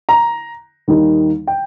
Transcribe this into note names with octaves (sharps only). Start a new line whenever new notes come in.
A#5
D#2 D#3 G3 A#3 D#4
G5